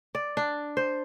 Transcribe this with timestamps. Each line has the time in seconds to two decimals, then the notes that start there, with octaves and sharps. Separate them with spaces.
0.15 D5
0.37 D4
0.77 C5